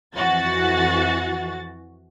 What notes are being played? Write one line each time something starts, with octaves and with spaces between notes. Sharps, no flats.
F2 E3 F#4 A6